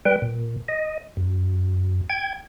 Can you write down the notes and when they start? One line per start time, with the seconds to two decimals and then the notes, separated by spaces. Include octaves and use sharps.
0.05 G3 B4 G5
0.22 A#2
0.68 D#5
1.17 F#2
2.10 G5 G#6